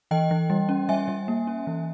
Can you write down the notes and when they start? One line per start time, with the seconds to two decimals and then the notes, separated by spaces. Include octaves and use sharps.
0.11 E3 D#5 G5
0.31 E3
0.50 G3
0.69 C#4
0.89 G3 E5 G#5
1.08 G3
1.28 A#3
1.47 C#4
1.67 E3